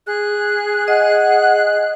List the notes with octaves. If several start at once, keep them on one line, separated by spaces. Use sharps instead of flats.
G#4 F#6
D#5 F#5 F#6